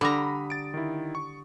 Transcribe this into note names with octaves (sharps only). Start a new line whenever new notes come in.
D3 G3 A#5 B5 D#6 A#6
A6 D7
D#3 E4
C#6